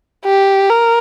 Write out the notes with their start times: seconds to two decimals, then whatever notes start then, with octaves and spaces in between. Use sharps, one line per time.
0.25 G4
0.70 A#4